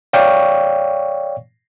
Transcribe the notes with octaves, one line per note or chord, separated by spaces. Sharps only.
C#5 D5 F5 G5 C#6